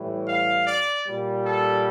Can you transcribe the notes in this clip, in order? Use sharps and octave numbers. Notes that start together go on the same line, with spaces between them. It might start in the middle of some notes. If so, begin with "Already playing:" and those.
Already playing: A2 E3 G3
F5
D5
A#2 G3
A4